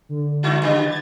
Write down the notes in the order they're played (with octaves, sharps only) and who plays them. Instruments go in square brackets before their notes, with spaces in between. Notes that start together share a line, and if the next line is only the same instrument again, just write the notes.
[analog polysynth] D3
[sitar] G2 E4 F#4
C#3 G3 B3
[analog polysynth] G#6 A6